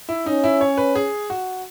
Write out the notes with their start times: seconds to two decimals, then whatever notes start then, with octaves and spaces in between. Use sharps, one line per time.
0.09 E4
0.26 C#4 D#4
0.44 E4
0.61 C#5
0.78 B4
0.95 G#4
1.30 F#4